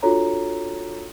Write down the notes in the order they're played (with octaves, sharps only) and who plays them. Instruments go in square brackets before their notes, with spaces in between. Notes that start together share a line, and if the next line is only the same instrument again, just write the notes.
[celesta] D4 F4 F#4 A4 C#5 A#5